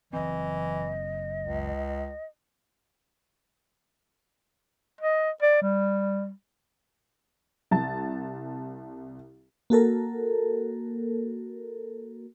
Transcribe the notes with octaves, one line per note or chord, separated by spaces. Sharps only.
F#1 E3 C4 D#5
C#2
D#5
D5
G3
C2 A5 A6
A#3 F#4 A4 A#4